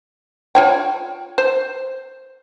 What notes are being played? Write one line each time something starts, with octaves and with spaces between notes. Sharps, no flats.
F4 C#5 G5
C5